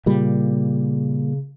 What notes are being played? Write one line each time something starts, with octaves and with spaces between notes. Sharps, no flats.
A#2 C#3 G3